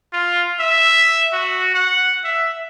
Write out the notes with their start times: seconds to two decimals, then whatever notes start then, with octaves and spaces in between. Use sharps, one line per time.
0.13 F4
0.60 E5
1.33 F#4
1.74 F#5
2.24 E5